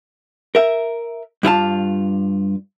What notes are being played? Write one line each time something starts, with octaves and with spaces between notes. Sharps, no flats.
A#4 E5
G2 E4 F4 A5